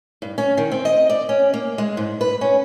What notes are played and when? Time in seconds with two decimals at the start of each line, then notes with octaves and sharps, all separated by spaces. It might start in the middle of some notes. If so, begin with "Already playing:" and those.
0.22 G2
0.38 C#4
0.57 D#3
0.71 C4
0.85 D#5
1.10 D5
1.29 C#4
1.54 A#3
1.78 G#3
1.97 G#2
2.21 B4
2.41 C#4